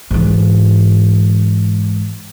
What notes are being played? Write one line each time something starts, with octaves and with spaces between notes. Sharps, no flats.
G#2 E3